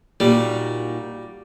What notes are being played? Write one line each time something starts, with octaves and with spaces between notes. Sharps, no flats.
A#2 G3 D#4 F#4